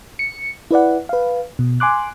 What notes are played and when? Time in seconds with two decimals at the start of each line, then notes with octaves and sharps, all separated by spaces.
0.19 C#7
0.71 E4 B4 D5 F#5
1.09 B4 F5
1.59 B2
1.80 G#5 C6 D6 F#6